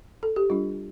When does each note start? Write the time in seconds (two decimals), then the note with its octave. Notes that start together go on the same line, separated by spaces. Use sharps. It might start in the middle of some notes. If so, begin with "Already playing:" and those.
0.23 A4
0.36 G4
0.50 G3 D4 F4